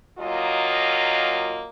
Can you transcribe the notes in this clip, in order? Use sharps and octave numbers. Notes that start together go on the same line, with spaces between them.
D#2 F#3 A#3 F4 D#5